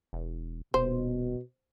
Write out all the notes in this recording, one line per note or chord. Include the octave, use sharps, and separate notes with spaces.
E1
D#1 B2 C5